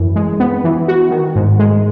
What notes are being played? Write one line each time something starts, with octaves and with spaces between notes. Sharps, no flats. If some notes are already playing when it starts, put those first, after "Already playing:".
Already playing: F#2 E3
G#3
B3
E3
F#4
D#3
G#2
G#3